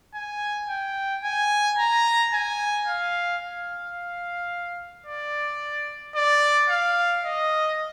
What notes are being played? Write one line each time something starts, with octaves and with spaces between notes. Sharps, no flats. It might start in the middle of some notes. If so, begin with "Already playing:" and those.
G#5
G5
G#5
A#5
G#5
F5
F5
D5
D5
F5
D#5